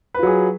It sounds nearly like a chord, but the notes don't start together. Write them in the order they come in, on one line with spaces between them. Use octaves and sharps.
B4 F4 F#3 G#4